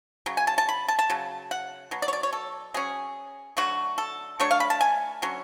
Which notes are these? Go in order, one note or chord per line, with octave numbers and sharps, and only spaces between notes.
C#3 F#3
G#5
A5
A5
B5
A5
A5
C#3 F#3
F#5
B2 F#3
D5
C#5
D5
C#5
A4
F#3 C#4 G#4
D3 F#3 A3 F#4
A4
F#3 A3 D4 C#5
F5
B5
A5
G#5
D3 F#3 C#4